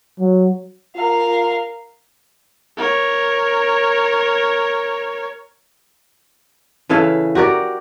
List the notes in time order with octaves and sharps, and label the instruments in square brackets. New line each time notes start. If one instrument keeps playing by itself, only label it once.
[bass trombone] F#3
[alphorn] F4 [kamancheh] A#4 F5
[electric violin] A#4 C#5
[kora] C#3 E3 A4 F5
F#4 G4 A#4 D5